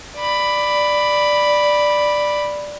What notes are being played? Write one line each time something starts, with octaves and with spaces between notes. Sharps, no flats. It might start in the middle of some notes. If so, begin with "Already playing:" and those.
D5 B5